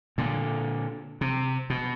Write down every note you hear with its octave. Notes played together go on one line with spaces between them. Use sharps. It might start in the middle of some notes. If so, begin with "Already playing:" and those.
A#2 D3
C3
B2